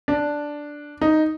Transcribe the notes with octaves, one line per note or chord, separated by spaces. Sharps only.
D4
D#4